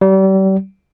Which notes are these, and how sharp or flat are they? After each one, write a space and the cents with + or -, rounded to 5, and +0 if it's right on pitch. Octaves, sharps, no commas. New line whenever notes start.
G3 -35